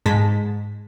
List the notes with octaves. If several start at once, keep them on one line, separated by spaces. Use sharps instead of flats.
G#2 G#3 A5 B6